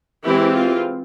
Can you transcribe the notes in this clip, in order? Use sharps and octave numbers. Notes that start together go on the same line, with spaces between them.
E3 G#3 C4 E4 G4
F4